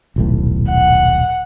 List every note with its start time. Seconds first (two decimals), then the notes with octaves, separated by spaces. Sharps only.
0.16 D#1 B1 A2
0.70 F#5